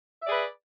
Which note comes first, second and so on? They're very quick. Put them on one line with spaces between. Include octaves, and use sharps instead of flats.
E5 D5 G#4 B4